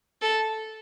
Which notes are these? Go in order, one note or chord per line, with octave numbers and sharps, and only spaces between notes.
A4